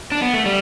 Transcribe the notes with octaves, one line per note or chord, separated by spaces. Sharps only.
D4
B3
A3
G3